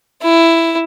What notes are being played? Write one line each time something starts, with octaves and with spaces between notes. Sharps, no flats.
E4